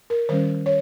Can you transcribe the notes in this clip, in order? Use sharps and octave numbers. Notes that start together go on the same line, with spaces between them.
A#4
D#3 G3 C#4 C5
C#5